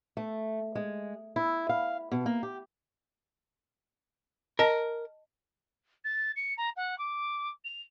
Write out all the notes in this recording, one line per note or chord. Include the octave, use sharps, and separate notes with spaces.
A3
G#3
E4
F5
B2
A#3
G4
A#4 D#5 A5
A6
C#7
A#5
F#5
D6
F7